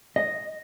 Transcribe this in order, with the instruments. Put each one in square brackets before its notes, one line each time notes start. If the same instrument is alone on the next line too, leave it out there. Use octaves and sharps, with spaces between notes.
[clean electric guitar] D#5